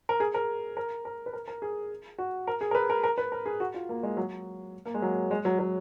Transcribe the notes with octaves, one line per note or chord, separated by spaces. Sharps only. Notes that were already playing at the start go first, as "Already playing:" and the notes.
A#4
G#4
A#4
A#4
A#4
B4
A#4
A#4
G#4
F#4
A#4
G#4
A#4
B4
A#4
A#4
B4
A#4
G#4
F#4
F4
A#3
G#3
F#3
A#3
G#3
F#3
G#3
F#3
F#3